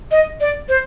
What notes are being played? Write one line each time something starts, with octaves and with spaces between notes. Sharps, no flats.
D#5
D5
C5